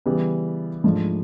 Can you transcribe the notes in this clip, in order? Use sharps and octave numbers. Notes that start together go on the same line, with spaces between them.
C#3 E3 G3 B3
G#2 F3 A3 D4